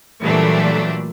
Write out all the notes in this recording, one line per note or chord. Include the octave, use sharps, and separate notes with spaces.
A#2 E3 F#3 G3 A3 D4